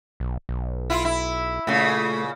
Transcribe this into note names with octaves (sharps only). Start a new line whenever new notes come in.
B1
B1
E4 F4
E4
A#2 C#3 A3